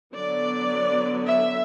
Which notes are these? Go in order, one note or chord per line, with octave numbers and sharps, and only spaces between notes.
D3 F#3 B3 D5
E5